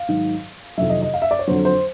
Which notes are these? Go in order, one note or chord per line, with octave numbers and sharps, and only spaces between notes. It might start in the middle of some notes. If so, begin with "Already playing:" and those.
Already playing: F5
G#2 D#3 F#3
F2 C3 D#3 F#3 E5
D#5
D#5
F5
E5
D5
C#5
F2 D3 F#3 C5
C5